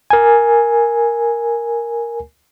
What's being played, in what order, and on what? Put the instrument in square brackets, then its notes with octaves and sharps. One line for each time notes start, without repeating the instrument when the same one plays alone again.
[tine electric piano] A#4 G#5